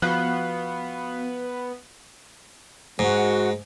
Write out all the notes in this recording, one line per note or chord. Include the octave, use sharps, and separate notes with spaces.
F3 B3 F#4 F5 B5 F#6
G#2 G#3 F#4